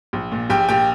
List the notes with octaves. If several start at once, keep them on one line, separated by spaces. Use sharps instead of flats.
A#1
A#2
A#1 G4 G5
A#2 G4 G5